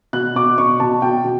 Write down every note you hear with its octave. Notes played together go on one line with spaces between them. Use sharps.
B2 F#6
B2 D6
B2 C#6
B2 A5
B2 G5
B2